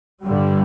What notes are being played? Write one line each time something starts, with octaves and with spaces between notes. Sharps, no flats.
G2 D3 G3